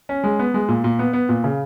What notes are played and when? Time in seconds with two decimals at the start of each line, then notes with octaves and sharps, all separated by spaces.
0.09 C#4
0.24 G#3
0.39 B3
0.54 G#3
0.68 A#2
0.84 A#2
0.99 B3
1.13 B3
1.29 A#2
1.44 C#3